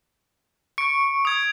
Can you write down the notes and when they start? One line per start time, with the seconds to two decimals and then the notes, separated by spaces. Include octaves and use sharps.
0.78 C#6 D7
1.25 D#6 G#6